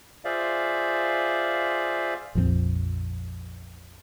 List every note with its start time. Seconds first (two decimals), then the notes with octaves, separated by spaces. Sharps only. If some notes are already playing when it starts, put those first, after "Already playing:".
0.25 F4 G#4 C5 D5 E5 F5
2.35 A#1 F2 E3 C4